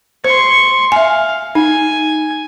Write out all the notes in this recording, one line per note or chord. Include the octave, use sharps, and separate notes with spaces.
C5 C6 C#6
E5 F5 G#5
D#4 G#5